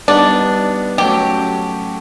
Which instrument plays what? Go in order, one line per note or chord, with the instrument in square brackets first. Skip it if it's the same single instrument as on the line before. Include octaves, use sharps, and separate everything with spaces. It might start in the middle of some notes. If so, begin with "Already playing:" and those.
[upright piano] G3 B3 D#4 [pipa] D4
[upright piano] F#3 A3 C#4 [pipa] G4